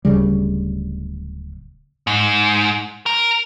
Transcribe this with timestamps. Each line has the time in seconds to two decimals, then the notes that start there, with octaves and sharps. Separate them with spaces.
0.05 D1 C#2 C#3 G3
2.07 G#2
3.06 A#4